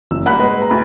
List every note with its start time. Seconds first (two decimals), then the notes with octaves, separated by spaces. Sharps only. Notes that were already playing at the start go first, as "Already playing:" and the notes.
0.11 F#1 E6
0.26 G3 A#3 F#5 B5 F#6
0.39 G#3 A#3 B4
0.58 B4 A#5
0.70 D2 E4 B5